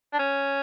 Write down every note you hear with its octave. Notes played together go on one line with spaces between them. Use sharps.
D4
C#4